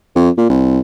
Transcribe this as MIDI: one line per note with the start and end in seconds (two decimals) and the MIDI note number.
0.15 0.29 41
0.38 0.49 46
0.49 0.79 36